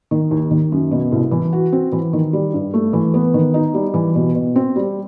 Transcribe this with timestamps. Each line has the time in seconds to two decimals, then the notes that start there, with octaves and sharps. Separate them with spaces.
0.11 D#3
0.31 D#2
0.51 D#3
0.72 F#2
0.91 B2
1.12 C2
1.31 E3
1.53 F#4
1.72 C4
1.92 E3
2.13 D#3
2.33 G3
2.54 G2
2.74 A3
2.93 E3
3.14 B3
3.34 D#3
3.54 D#4
3.74 G3
3.94 E3
4.15 B2
4.35 B2
4.56 C4
4.76 G3